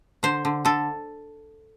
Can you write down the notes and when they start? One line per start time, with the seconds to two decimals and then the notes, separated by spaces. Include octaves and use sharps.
0.23 D3 C5
0.45 D3
0.65 D3 A4